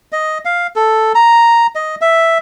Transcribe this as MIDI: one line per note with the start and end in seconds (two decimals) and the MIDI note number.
0.12 0.38 75
0.45 0.67 77
0.76 1.13 69
1.15 1.67 82
1.75 1.95 75
2.01 2.38 76